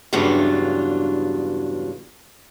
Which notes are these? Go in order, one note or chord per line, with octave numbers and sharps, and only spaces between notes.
E2 G2 C#3 F#3 D4 F4